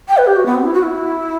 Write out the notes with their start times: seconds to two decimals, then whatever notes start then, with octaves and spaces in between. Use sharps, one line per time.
0.08 G5
0.17 B4
0.27 G4
0.36 F#4
0.46 B3
0.55 C4
0.64 E4
0.73 F#4
0.83 E4